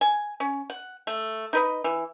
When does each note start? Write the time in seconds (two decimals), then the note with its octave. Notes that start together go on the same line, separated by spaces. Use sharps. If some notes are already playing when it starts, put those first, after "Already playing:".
0.01 G#5
0.40 C#4
0.70 F#5
1.07 A3
1.53 D#4 B4 D#5
1.84 E3